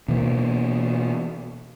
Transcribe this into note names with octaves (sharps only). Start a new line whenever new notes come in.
B2 E3 A#3